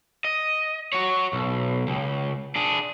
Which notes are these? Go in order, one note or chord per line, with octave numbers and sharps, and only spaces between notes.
D#5
F#4 C#5
B1
C#2
D4 G#4